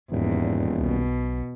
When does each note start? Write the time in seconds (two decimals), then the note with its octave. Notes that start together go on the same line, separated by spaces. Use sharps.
0.12 D#1 E2 G#2
0.78 B1 B2